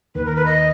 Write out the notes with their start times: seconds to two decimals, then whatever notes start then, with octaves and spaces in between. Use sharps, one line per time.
0.15 D#2 D#3 B4
0.25 A#4
0.36 B4
0.46 D#5